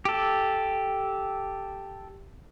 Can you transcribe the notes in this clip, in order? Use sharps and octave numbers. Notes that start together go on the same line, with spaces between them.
G4 A4